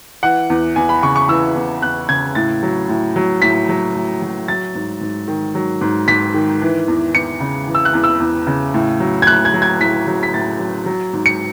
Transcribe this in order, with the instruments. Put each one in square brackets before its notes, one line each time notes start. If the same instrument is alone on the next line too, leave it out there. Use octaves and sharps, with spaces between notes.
[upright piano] E3 F#5
E2
E2 G#5
B5
C#3 C#6
C#6
E3 E6
E2
E2 F#6
C#3 G#6
A2 A6
F#3
A2
F#3
A2 B6
F#3
A2
F#3
F#3 A6
G#2
G#2
D#3
F#3
G#2
G#2 B6
D#3
E3
E2
E2 C#7
C#3
E3
E6
F#6
E2
E6
E2
C#3
A2
F#3
G#6
A2 F#6
G#6
F#3
G#6
A2 B6
F#3
B6
A2 A6
F#3
F#3
G#2
C#7